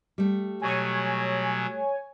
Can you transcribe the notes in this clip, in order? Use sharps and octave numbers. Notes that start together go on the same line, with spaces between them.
G3 A3
B2 F#3 C#5 G#5